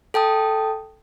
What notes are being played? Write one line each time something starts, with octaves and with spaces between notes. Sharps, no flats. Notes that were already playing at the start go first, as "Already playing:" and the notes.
A4 G5 A5 D#6